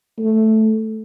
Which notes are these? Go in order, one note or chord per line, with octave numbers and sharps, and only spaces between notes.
A3